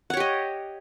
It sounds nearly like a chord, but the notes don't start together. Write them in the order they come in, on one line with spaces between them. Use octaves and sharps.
F#5 C#5 G4 D#5